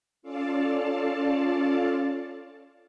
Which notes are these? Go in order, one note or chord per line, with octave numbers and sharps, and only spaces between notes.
C#4 F4 A4 D5 F5 A5